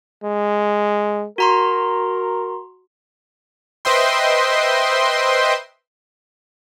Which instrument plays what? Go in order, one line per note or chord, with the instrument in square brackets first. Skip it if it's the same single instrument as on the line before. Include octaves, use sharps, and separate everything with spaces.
[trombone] G#3
[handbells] F#4 A#5 C6 [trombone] A#4
[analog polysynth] B4 C5 D#5 E5 G5 C6